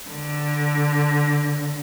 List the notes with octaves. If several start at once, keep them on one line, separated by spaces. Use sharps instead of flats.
D3